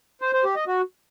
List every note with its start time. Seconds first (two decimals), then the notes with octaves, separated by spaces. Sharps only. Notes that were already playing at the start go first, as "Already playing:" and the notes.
0.21 C5
0.33 C5
0.44 G4
0.56 D#5
0.67 F#4